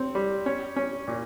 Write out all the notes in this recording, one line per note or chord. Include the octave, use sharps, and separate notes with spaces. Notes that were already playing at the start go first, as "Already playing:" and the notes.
Already playing: C4
G3
C#4
C#4
A#2